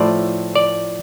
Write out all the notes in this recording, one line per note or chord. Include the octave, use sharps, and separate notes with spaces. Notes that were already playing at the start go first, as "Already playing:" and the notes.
Already playing: A2 F3 A3 D5
D5